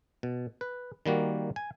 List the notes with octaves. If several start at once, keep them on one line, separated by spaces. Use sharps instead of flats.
B2
B4
D#3 G3 A#3 F#4
G#5